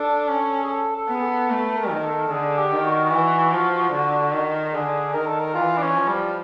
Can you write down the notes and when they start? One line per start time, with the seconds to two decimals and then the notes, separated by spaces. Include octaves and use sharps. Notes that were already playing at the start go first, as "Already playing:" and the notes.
Already playing: D4 A4
0.28 C#4
0.64 G#4
0.70 A4
0.97 A4
1.09 B3
1.15 G#4
1.23 A4
1.50 A3 B4
1.77 A#4
1.91 D#3 A#4
2.05 A4
2.31 D3 G#4
2.58 G4
2.72 D#3
2.85 F#4
3.12 E3
3.53 F3
3.92 D3
4.33 D#3
4.74 D3 G#4
5.14 D#3 A#4
5.27 A4
5.40 A#4
5.55 E3 F4
5.78 D4
5.82 C#4
5.96 F3
6.08 G3